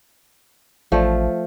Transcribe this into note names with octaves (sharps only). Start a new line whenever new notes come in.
A1 F3 A3